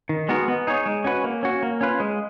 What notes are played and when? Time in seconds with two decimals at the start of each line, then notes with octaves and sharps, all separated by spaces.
0.09 D#3
0.29 G#3 B3 F#4 A#4
0.48 B3
0.67 D#4 G#4 C#5
0.86 G#3
1.04 C#4 F#4 B4
1.24 A#3
1.43 C#4 F#4
1.63 A#3
1.81 C#4 F4 B4
2.00 G#3